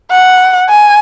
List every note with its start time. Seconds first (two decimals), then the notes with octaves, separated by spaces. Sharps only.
0.11 F#5
0.69 G#5